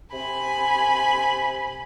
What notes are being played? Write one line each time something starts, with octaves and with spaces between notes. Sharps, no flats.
C3 G#5 B5